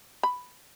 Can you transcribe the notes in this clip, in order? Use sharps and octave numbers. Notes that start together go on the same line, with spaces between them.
B5